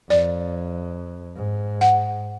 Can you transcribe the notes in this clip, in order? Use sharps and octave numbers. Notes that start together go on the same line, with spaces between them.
F2 D5
G#2
F#5